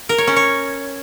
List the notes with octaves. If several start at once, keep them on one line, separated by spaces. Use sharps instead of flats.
A#4
C#5
C#4
C#5